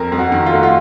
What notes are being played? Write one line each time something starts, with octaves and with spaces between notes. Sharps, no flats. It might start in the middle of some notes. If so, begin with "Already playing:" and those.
Already playing: F2 A#4
F2
F#4
D#3
F4
A3 F#4
F4